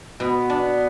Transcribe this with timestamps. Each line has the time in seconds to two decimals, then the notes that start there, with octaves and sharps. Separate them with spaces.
0.20 B2 B3
0.50 D4